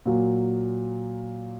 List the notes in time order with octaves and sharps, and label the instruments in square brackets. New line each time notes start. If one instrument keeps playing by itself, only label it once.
[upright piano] A#2 F#3 A#3